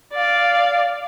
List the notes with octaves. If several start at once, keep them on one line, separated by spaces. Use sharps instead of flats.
D5 F5